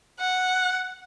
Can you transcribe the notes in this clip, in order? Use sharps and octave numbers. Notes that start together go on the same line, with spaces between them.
F#5